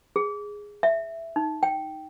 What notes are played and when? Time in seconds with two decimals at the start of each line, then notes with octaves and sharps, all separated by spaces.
0.16 G#4
0.83 E5
1.36 D#4
1.63 G5